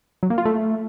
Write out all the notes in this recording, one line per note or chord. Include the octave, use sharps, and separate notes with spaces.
F#3
A#3
F4
A3